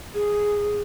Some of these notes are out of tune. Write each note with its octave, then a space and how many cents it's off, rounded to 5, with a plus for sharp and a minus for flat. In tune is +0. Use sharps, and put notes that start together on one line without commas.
G#4 -5